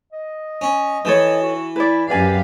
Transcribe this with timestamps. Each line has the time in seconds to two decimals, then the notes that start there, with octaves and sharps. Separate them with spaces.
0.12 D#5
0.61 C#4
1.05 E3 D#4 A4 C#5
1.42 F#4
1.76 E4 B4 D5
2.10 F#2 G4 B4 D5 F5 G#5